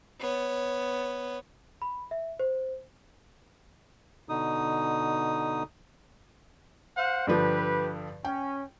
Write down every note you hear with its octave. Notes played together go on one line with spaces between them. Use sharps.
B3 C#5
B5
E5
C5
B2 D3 D#4 D#6
C5 F5 F#5
G2 D3 F3 G4 B4
C#4 G5